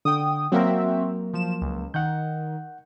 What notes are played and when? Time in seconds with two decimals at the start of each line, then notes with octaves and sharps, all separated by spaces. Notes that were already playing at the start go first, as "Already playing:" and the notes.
0.05 D3 G5 D#6
0.52 F#3 A#3 C4 F#4 A#4 E5
1.33 F3 E7
1.61 C#2
1.94 D#3 F#5 G6